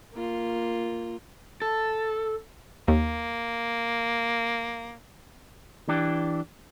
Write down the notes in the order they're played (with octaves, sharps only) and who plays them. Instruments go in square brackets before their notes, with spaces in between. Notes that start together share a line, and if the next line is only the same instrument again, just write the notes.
[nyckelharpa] A#3 F4
[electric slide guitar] A4
[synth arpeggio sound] D#2 [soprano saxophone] A#3
[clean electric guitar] E3 D4 G4